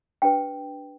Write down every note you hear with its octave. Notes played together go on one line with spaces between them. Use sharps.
D4 G4 B4 G5